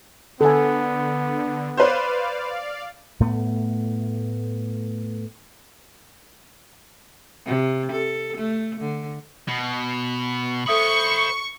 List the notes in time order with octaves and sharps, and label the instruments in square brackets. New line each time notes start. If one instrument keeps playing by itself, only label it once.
[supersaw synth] D3 [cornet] B3 [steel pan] A4 G#5
[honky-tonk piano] B4 C5 [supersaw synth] D5 F5
[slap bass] A2 A3 B3
[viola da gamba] C3
A4
A3
D3
[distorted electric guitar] B2
[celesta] A4 E5 D#6 [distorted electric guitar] C5 B5 [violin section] C#6